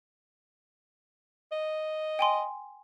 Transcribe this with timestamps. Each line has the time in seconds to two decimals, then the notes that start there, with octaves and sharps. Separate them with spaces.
1.52 D#5
2.19 G5 G#5 C6